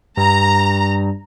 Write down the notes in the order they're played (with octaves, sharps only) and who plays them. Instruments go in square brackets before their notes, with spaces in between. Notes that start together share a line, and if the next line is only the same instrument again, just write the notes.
[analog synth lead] G2 [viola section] A#5